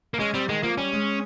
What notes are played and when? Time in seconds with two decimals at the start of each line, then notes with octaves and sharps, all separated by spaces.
0.14 A#3
0.19 G#3 C#4
0.34 G3 C4
0.48 D#3 G#3
0.63 F3 A#3
0.78 G3 C#4
0.92 G#3